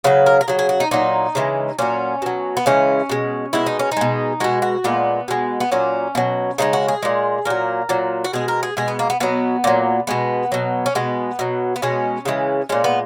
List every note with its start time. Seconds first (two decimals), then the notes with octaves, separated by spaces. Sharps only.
0.04 C#3 F#3 B4
0.26 A#4
0.41 A#4
0.48 C#3 F#3 G#4
0.59 G#4
0.69 F#4
0.80 D#4
0.91 A#2 F#3 D#4
1.35 C#3 E3 G#3
1.79 A#2 F#3 C#4
2.22 B2 F#3
2.57 B3
2.66 C#3 E3 G#3 C#4
3.09 B2 G#3
3.53 B2 G#3 E4
3.66 D#4
3.79 C#4
3.92 D#4
3.97 B2 G#3
4.40 B2 G#3 F#4
4.62 F#4
4.84 A#2 G#3 B3
5.28 B2 G#3
5.60 B3
5.72 A#2 F#3 C#4
6.15 B2 F#3
6.58 C#3 E3 G#3 D#4
6.73 F#4
6.88 G#4
7.03 A#2 G#3
7.45 A#2 F#3 A#4
7.89 A#2 F#3
8.24 F#4
8.33 B2 G#3 G#4
8.48 A#4
8.63 G#4
8.77 B2 G#3 G#4
8.88 B3
8.99 A#3
9.10 B3
9.20 B2 F#3 B3
9.64 A#2 F#3
10.07 B2 G#3 B3
10.52 B2 F#3
10.86 C#4
10.95 B2 G#3 B3
11.39 B2 F#3
11.76 B3
11.82 B2 G#3 C#4
12.25 C#3 E3 G#3
12.69 A#2 G#3 C#4
12.84 B3